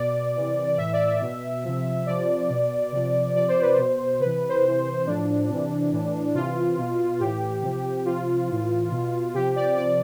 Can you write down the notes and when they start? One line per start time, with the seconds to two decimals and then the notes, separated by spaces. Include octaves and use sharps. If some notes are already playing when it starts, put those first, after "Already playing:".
Already playing: B2 D5
0.35 C3 E3
0.67 D5
0.78 A2 E3 E5
0.93 D5
1.07 E5
1.21 B2
1.63 C3 F3
2.06 C3 F3 D5
2.50 B2
2.92 C3 F3
3.35 C3 F3 D5
3.48 C5
3.61 B4
3.73 C5
3.78 B2
4.20 C3 E3 B4
4.49 C5
4.63 C3 E3
5.06 A2 F3 D4
5.49 C3 E3
5.92 A2 E3
6.34 C3 E3 F4
6.78 B2
7.20 A2 E3 G4
7.62 C3 F3
8.05 C3 F3 F4
8.48 A2 E3
8.91 B2
9.34 C3 F3 G4
9.56 D5
9.76 C3 F3 D5